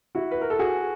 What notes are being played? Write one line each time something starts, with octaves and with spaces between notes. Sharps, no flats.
E4 F#4
B4
A#4
A4
F#4 G#4